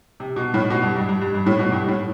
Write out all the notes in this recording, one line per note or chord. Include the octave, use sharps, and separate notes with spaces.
C3
B2
A2
B2
G2
G2
G2
G2
G2
A2
B2
G2
A2